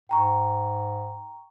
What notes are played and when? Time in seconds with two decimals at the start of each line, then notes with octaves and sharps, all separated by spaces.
0.09 G#2 G5 A#5 C#6